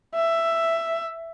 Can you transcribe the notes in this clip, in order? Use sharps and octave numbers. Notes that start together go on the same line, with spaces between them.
E5